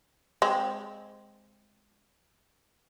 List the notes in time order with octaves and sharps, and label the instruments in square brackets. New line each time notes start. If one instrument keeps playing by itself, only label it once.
[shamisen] G#3 C4